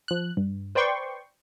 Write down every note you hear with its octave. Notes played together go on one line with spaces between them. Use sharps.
F3 F#6
G2
B4 C5 D5 G5 C6 C#6